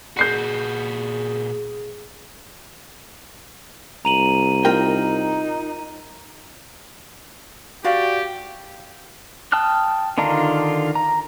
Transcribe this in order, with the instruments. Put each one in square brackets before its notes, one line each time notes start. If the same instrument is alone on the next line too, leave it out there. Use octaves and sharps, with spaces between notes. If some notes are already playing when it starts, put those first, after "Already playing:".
[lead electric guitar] A#2 F#4 [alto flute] G#4 [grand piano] G6 C7 C#7
[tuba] C2 [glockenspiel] A#5 D#7 F#7
[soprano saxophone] D#4 [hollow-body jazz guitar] F4 A#4 G5
[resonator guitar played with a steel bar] F#4 D5 F5 [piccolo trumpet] G4
[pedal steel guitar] G5 A5 D#6 F6 F#6
D3 D#3 D4 F4 A#5
A#5